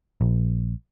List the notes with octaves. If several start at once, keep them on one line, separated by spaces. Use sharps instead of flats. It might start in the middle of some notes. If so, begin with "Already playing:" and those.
A#1